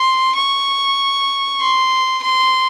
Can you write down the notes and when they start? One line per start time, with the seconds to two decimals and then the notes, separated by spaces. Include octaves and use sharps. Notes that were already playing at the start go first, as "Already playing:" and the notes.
Already playing: C6
0.36 C#6
1.60 C6
2.23 C6